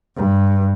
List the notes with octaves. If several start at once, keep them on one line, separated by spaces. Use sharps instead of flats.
G2